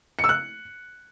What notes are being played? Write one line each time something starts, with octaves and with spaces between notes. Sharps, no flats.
C#7
E6
F#6